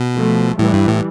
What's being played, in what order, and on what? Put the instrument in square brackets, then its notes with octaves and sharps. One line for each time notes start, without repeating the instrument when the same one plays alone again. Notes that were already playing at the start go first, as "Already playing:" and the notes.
Already playing: [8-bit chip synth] B2
[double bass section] F3 A3
[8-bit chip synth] A2 [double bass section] E3 G3
[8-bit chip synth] G2
A2